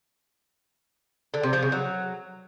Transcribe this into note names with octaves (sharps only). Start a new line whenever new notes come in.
D3
C3
F3
C#3
F#3